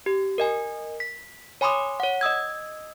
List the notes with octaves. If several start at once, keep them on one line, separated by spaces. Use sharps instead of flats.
G4
A#4 D#5 G#5
B6
C#5 G#5 B5 C6 D6 D#6
C#5 F#5
D#5 D#6 E6 G#6